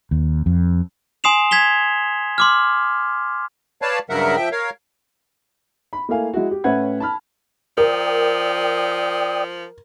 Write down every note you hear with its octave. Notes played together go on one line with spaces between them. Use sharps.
D#2
F2
G#5 C6 D#6 C7 E7 F7
G#6 B6 F7 G7
C6 D6 F6
B4 C#5 D5 F5 A5
G2 C#3 F#3 A#4 E5 F#5
F3 E5 G5
A#4 C#5 F5
B5
A3 A#3 E4 F5 G#5
G#3 E4 F#4
G4
A2 C#4 B4 E5 F#5 G#6
A5 B5 F6
F3 A#4 D5 G5 D#6